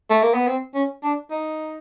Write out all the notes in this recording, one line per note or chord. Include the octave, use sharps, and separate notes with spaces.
A3
A#3
B3
C4
C#4
D4
D#4